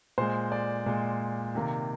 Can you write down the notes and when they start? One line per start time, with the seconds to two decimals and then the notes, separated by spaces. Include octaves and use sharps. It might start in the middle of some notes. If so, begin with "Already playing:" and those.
0.18 A#2 G#3 C5
0.52 D5
0.86 A#2 G#3
1.55 C3 D#3 A#3